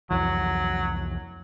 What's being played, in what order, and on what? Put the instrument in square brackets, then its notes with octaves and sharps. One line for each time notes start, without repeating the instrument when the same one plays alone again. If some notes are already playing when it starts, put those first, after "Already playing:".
[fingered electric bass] C2 F2 E3 [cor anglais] F#3